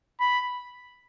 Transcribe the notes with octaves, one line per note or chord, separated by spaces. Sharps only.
B5